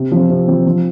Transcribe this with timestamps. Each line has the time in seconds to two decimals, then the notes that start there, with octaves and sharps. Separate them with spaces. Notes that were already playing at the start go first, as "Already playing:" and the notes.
Already playing: C3
0.12 F3 C4
0.30 C3
0.47 F3 C4
0.66 F3